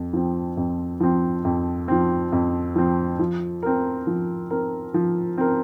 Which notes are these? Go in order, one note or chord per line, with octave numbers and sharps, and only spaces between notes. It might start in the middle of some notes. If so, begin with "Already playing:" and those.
Already playing: F2
F3 C4
F2
F3 C4
F2
F3 C4
F2
F3 C4
F3
C4 A#4
F3
C4 A#4
F3
C4 A#4